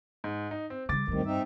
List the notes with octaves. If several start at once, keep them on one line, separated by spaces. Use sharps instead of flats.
G#2
D#4
C4
C#3 G3 D6 A6
D2 G2 C3 D#3 G3
C4 D#4 E5